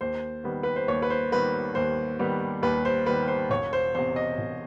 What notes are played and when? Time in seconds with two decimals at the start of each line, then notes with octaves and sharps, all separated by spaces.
0.01 D#2 C5
0.44 D#3 G3 B3
0.63 B4
0.76 C5
0.88 D#2 C#5
1.02 B4
1.10 C5
1.32 D#3 G3 B3 B4
1.75 D#2 C5
2.19 D#3 G3 B3
2.62 D#2 B4
2.85 C5
3.06 D#3 G3 B3 B4
3.28 C5
3.50 E1 C#5
3.73 C5
3.95 E2 C3 C5
4.16 D#5
4.38 E1